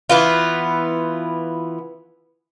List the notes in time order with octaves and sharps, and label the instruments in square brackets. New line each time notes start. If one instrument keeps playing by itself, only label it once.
[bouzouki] E3 B3 F4